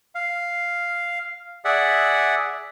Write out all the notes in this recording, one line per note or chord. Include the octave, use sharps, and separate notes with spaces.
F5
G#4 D5 E5 F#5